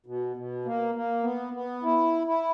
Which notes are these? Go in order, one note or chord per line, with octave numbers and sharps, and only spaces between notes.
B2
B2
A#3
A#3
B3
B3
E4
E4